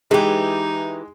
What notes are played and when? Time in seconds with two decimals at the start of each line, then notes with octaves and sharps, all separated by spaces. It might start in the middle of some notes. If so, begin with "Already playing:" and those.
0.11 E3 G#3 D#4 G4